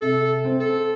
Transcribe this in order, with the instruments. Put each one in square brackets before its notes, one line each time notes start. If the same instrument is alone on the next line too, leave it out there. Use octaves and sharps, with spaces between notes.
[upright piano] C3 [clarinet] A4
[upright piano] C4
[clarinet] A4